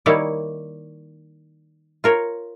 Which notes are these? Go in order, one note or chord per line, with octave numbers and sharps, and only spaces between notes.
D#3 G3 A#3 E4 C#5 D5
F4 A#4 C#5